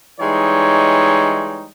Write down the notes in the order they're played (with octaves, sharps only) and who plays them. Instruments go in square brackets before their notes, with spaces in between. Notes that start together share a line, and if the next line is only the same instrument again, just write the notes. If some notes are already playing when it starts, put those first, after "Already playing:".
[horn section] E3 G3 G#3 D#4 C#5